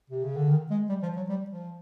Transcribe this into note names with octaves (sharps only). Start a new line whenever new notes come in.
C3
C#3
D3
D#3
G#3
G3
F3
F#3
G3
F3